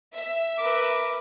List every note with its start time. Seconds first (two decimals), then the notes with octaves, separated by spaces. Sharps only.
0.15 E5
0.58 A#4 B4 D6